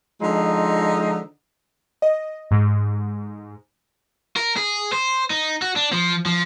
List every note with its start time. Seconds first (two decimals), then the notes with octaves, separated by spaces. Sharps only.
0.21 D3 F3 G#3 D#4
2.02 D#5
2.51 G#2
4.36 A#4
4.57 G#4
4.93 C5
5.30 D#4
5.62 F#4
5.76 D4
5.92 F3
6.26 F3